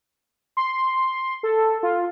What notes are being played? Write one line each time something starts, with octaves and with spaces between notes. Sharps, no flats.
C6
A4
F4